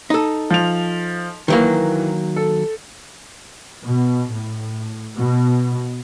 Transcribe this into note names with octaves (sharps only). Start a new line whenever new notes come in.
D#4 A4
F3 F7
D#3 E3 F#3 A#3
A4
B2
A2
B2